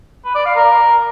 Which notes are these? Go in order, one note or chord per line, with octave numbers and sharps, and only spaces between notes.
B4
D5
F5
A#4